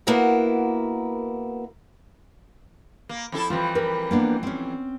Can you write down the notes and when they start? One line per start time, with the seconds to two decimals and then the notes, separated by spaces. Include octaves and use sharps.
0.07 A#3 B3 E4 F#4 A#4
3.09 A#3
3.32 F2 E4 A4
3.50 F2 E3 G3 F4
3.75 A#4 B4
4.11 A#3 B3 D4
4.43 C4 C#4